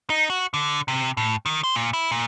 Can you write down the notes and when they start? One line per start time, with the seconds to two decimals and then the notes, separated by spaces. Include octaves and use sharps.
0.10 D#4
0.30 F#4
0.54 D3
0.88 C3
1.17 A2
1.46 D#3
1.64 C5
1.75 A#2
1.93 E4
2.12 A#2